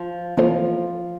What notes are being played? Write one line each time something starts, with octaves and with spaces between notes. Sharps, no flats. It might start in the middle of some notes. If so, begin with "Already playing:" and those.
Already playing: F3 F4
E3 F3 A#3 E4 F4 A4 C5